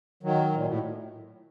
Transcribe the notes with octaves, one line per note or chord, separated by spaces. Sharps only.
D#3 F#3
A#2
A2